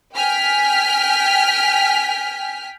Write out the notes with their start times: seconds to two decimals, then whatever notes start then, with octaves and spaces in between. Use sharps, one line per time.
0.16 G5 G#5 F6 B6